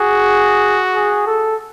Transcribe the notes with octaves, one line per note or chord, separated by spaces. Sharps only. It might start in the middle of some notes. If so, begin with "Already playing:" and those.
Already playing: F#4 G#4
G#4
A4